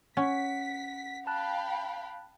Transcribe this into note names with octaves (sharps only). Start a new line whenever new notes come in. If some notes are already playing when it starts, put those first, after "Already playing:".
C#4 F#5 B6
F5 G5 A5 B5 F#6